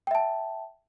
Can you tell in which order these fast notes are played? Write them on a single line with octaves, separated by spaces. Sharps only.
G5 E5 A5